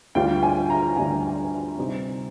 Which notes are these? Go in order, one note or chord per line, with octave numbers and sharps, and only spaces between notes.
D2 D3 G3 D4 F4 G5
G#5
A#5
D2 D3 G3 D4 F4 G#5
C3 G3 C4 D#4